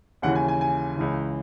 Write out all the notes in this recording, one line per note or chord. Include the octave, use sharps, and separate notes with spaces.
D#2 C#3 E3 F#5
G#5
G#5
G#5
C#2 C#3 E3